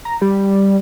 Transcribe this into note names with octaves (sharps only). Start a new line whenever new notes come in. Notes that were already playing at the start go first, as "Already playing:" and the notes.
A#5
G3